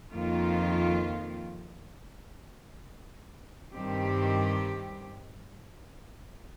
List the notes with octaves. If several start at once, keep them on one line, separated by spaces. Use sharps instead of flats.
F2 D#3 A#3 F4
G2 D#3 C4 G4